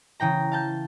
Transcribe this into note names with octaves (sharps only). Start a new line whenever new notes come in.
C#3 E3 G5 A#5
F5 A5 G6